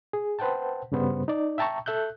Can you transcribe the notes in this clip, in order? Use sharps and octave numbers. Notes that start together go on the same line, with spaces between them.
G#4
B4 C5 F#5 G5 A5
G2 C#3 G3 B3 C5
D#4 D5
E5 G5 A5 A#5 C#6
A4 E5 F#6 G6